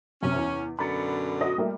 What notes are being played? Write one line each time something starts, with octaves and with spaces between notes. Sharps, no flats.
F#2 C3 C#4
E2
F#2 B2 D3 B5 A6 C#7
F#4 D#5
G3 A3 A#3